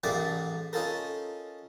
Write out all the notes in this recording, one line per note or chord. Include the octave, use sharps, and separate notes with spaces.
A1 G#2 A3 A#3 A#4 D5
C#4 D#4 F4 A4 A#4